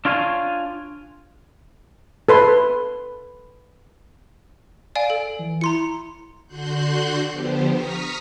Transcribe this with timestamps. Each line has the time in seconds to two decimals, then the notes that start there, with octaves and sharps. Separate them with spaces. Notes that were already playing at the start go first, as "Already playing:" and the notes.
0.05 D4 F4 C#5 F5 F#5 G#5
2.29 A4 B4 C6
4.95 D5 F5 G#5 D7
5.10 A4
5.39 E3
5.61 E4 A#5 C6 C#7
6.47 D3 F#4 C6 F#6 G6
7.30 D3 F3 B3 G4 C5
7.70 A#5 C#6 D#6 F6 B6